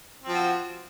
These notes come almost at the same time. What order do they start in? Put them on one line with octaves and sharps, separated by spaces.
C4 F3 F#4